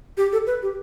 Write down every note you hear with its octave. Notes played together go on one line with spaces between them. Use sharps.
G4
A4
B4
G4